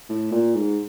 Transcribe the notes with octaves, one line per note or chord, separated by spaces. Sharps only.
A2
A#2
G#2